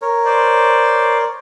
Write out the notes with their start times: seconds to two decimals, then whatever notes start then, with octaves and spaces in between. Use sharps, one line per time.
0.02 A#4 C#5
0.25 C5 D5